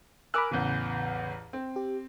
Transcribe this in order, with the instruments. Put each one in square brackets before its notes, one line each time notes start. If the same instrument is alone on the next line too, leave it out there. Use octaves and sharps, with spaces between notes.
[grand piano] A#4 G#5 E6 [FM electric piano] B5 D6 F#6
[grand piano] A1 E2 E3 [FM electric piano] C#3 G6
[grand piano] C4
[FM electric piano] G4